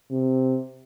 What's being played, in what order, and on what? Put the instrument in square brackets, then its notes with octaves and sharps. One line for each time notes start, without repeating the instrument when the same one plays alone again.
[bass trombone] C3